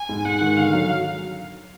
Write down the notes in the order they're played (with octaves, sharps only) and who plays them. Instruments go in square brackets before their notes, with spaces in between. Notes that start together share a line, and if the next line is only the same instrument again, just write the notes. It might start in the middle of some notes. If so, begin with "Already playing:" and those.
Already playing: [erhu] G#5
[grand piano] G#2
[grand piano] G#2 [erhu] F#5
[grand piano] D#3
[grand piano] D3 [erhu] F5
[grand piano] F#3